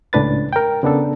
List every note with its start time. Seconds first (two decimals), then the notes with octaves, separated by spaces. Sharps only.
0.13 C#2 A2 D4 B4 A6
0.53 A#4 G5
0.83 C#3 B3 D4 A4